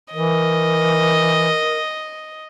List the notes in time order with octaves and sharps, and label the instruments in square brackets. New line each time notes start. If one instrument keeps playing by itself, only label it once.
[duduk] E3 [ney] A#4 [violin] D#5